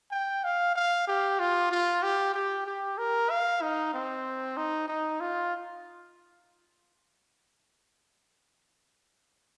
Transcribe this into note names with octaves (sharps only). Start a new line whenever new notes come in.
G5
F5
F5
G4
F4
F4
G4
G4
G4
A#4
F5
D#4
C4
D#4
D#4
F4